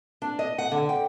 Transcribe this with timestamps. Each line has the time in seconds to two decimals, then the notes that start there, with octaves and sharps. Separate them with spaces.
0.22 D4
0.39 D#5
0.58 F#5
0.71 D3
0.89 G5